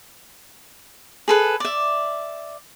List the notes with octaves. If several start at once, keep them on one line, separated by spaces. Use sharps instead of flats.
G#4 A4 B4
D5 E5